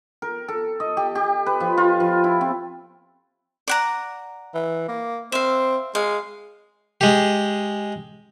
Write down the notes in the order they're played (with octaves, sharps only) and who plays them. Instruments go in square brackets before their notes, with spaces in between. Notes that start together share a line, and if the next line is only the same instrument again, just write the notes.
[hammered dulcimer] A#4
A4
D#5
G4
G4
B4
F3
F4
F3
E4
C4
[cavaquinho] D5 F#5 A#5
[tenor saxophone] E3
A#3
[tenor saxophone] C4 [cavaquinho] E5 F5
[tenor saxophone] G#3 [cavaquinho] F5
[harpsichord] G#3 G4